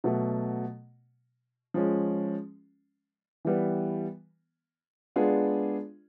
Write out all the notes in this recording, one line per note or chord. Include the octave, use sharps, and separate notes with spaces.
B2 F#3 A3
F3 G#3 C#4
E3 G3 B3
G#3 B3 D4 F4 G#4